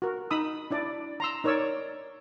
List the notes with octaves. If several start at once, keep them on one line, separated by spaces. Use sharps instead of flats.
F#4 A#4
D#4 B5 D#6 E6
D4 E4 D5
A#5 C6 E6
D#4 A#4 C#5 D5 E6